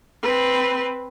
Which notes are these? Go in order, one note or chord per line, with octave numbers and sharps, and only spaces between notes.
C4 B4